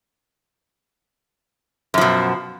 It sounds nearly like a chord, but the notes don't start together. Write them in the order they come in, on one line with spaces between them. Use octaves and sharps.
F#2 F3 B2